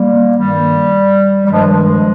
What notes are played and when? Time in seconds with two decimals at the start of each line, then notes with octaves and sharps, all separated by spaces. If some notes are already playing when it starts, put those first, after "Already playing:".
Already playing: G3 A#3
0.36 G2 D#3 G3
1.45 G3
1.50 G2 D#3 F3 G#3
1.64 F3 G#3